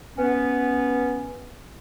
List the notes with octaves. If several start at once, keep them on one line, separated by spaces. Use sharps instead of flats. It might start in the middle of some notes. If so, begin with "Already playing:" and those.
B3 C#4